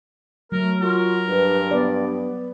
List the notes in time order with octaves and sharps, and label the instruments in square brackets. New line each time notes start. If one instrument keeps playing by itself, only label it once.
[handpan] F#3 [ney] A3 [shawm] A#4
[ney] F4 [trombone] F#4 [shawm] A#4
[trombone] G2 [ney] B4
[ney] B3 [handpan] B4 D5